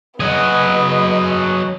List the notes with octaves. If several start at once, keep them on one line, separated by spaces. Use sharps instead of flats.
F#3 B3 G#4 D#5